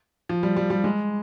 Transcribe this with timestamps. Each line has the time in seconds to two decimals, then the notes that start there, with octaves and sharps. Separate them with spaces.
0.29 F3
0.43 G3
0.57 G3
0.70 G3
0.84 G#3